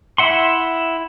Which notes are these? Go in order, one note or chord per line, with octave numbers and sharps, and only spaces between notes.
E4 E5 F#5 C6